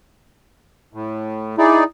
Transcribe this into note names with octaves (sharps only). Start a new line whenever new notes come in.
A2
D#4 E4 G#4 D5